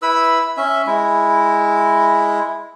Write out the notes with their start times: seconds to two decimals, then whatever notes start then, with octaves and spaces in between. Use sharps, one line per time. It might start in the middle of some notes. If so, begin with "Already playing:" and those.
0.02 E4 B4 B5 E6
0.57 C#4 E5
0.87 G#3 E4